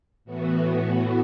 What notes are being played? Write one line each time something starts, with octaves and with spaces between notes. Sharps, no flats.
A2 E3 B3 F#4